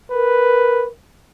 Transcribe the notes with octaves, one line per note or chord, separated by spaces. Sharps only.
A#4 B4